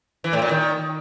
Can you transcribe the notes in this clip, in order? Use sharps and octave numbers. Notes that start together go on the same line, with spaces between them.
E3
A2
A#2
D#3